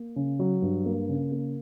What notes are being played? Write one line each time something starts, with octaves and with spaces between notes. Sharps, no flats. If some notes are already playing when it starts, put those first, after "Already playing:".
Already playing: A#3
C#3
F#3
G2
A#3
C#3
A#3